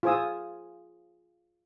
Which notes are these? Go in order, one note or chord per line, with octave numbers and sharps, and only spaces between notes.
F4 G#4 C5 G#5 D#6 E6